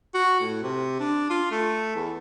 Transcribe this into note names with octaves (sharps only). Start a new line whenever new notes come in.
F#4
A2
C3
D4
F4
A3
E2